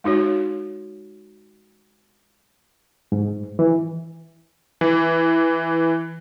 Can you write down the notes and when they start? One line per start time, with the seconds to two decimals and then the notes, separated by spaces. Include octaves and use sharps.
0.04 G#3 D#4 F#4 C#5
3.12 G#2
3.59 E3
4.81 E3